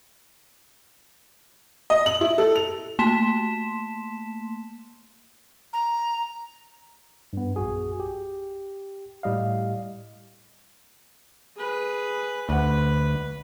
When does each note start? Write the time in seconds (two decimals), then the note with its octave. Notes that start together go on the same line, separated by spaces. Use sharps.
1.90 D#5
2.06 F#7
2.21 E4
2.38 A4
2.56 F7
2.99 A3 A#3 A5 C6 B6 E7
5.73 A#5
7.33 G2 B3
7.56 A#1 F#2 F#4 G#4
8.00 G4
9.23 A2 G3 D#5 F5
11.57 G#4 B4
12.49 D2 B4 F#5